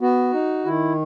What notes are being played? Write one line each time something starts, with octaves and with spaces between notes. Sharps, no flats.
B3 F#4
D#4
D#3 E4